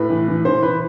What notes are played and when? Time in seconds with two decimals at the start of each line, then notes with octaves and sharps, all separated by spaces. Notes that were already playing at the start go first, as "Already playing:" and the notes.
Already playing: A2 B4
0.10 E3
0.28 E3
0.45 E3 C5
0.62 E3 B4